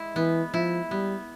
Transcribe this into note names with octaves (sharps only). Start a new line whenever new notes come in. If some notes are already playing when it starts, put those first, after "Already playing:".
Already playing: G#3 E4
E3 B3
F3 E4
G3 B3